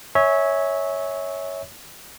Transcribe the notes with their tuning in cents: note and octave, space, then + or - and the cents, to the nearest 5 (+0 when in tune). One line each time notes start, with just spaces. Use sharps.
C#5 +0 E5 -25 G#5 +0